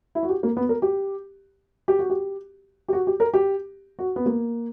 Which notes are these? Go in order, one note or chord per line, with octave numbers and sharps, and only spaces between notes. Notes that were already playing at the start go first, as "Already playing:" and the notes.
E4
F#4
G4
A#3
B3
A#4
G4
G4
F#4
G4
G4
F#4
G4
A#4
G4
F#4
B3
A#3